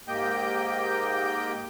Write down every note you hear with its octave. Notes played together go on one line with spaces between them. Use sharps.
G#2 A#3 G4 D#5 G5 G6